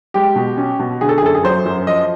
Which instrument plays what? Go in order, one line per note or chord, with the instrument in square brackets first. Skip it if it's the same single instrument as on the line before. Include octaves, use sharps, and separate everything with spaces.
[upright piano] G#3 G4
B2
C#4
B2
D3 G#4
A4
G#4
F#2 A4
G#4
F#3 C5
F#2
F3 D#5